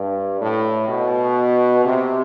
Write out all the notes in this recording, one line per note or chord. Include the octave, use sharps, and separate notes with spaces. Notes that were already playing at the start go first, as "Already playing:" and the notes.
Already playing: G2
A2
B2
C3